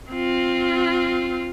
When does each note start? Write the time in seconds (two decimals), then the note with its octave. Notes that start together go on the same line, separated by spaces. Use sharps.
0.12 C4 F4